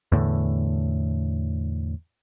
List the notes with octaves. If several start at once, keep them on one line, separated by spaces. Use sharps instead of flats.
E2 A2 D3